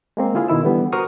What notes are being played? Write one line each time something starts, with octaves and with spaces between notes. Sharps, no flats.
G#3 A#3 C4
D3 E4 F4 G#4
B2 D#3 E4 E6
D3 E3 G3 B3
F#4 A#4 C5 C#6 D#6 F6